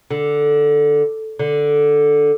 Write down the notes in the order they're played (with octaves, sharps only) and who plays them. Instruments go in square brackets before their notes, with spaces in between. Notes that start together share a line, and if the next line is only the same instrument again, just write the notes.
[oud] D3
D3